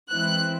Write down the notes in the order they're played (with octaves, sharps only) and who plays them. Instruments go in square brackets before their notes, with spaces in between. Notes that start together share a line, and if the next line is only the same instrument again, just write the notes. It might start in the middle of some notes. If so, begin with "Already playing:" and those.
[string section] E3 G#3 C4 E4 F#6